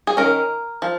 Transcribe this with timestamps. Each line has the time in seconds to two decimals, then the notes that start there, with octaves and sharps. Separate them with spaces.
0.07 G#4
0.17 D#3 C#4 A#4
0.82 F3